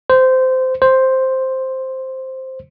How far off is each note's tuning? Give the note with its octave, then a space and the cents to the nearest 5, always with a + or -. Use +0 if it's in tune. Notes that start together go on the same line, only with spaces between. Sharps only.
C5 -15
C5 +5